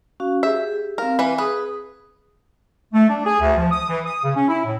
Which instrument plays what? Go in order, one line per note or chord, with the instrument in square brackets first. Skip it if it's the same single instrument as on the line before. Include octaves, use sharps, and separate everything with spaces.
[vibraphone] C#4 F#4 F5
[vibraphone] G4 G#4 [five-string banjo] E5
[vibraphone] C4 F5 [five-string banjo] A#4
[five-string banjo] E3 B4
[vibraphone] G#4 D#6 [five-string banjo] B4
[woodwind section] A3
D4
G#4
D2
F3
D#6
E3
D#6
C#3
C#4
E4
A2